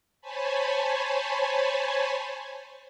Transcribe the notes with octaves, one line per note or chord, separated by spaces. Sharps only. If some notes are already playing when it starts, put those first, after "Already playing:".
C5 C#5 G#5 A5 B5